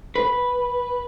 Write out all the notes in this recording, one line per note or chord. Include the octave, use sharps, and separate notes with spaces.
B4